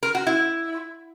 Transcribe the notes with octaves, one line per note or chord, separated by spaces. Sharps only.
A#4
F#4
E4